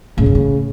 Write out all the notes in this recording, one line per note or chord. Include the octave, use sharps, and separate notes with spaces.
A2 C#3
G2
A2